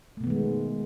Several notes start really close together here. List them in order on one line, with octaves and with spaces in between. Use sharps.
A3 B2 B3 D#3 G#3